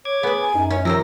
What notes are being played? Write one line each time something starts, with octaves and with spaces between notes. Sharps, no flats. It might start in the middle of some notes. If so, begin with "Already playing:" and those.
C#5 D6 G#6
B3 G#4 B4
G#5
F#2 D#4
C#4 C#5
C3 D#3 F3 C5 E6 A#6